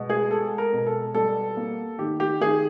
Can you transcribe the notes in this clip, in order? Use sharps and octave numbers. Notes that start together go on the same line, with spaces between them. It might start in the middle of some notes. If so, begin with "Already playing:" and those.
Already playing: B2 G#3
G#4
G#3 A4
A#4
B2
A4
G3 A4
A#3
D#3 G4
G4
D#3 G#4